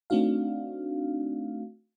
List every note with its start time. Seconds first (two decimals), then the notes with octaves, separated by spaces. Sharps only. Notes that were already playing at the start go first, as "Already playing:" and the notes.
0.10 A3 C4 D4 D#4 F#4 F5